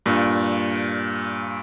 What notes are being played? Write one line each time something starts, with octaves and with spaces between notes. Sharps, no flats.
G2 A#2